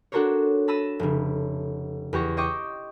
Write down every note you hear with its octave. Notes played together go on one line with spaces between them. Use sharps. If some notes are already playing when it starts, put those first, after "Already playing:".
D4 F#4 A4 A#4 C5 C#5
A5 B5 E6 A#6 D#7 E7
F1 C#3
E2 G4 C#6 A#6
C5 D#5 G5 C#6 D6